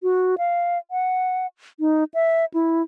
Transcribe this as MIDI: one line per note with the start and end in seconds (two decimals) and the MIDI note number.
0.03 0.35 66
0.38 0.78 77
0.91 1.47 78
1.80 2.04 63
2.14 2.45 76
2.54 2.82 64